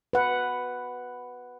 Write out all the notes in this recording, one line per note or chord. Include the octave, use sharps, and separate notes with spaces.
B4 F#5